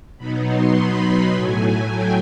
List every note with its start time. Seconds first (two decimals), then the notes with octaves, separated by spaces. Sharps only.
0.18 B2 F#3 B3 D#4 B5
0.47 C6
0.75 B5
1.33 A2 F#3 A3 G#5
1.91 G5